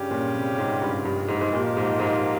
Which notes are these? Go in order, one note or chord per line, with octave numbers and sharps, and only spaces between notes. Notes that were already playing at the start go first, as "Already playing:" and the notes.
Already playing: G2 C#3 G3 C#4 G4
A#2
C3
G#2
G2
G2
G#2
G#2
A#2 F3 A#3 D#4 G4
G#2
G#2